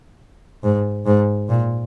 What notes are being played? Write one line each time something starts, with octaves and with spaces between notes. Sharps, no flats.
G#2
G#2
A#2